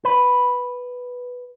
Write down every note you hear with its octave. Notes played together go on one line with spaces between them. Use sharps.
B4